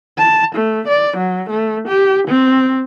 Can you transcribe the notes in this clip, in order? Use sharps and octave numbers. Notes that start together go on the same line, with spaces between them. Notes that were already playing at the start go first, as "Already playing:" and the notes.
A5
A3
D5
F#3
A3
G4
C4